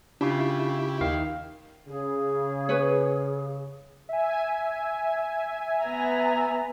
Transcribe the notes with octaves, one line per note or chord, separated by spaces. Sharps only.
C#3 D4 E4 F4 G4
D#2 D#3 F5
C#3 G#4
B4 C#5
E5 G#5
B3 A#5